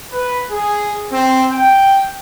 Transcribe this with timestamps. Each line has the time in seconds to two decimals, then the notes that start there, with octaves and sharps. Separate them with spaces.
0.12 B4
0.51 G#4
1.11 C4
1.50 G5